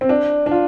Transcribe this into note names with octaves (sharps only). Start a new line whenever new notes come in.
C4
D4
D4
F4